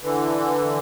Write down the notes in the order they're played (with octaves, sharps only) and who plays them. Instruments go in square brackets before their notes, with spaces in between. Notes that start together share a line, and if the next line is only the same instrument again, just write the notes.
[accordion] D3 E3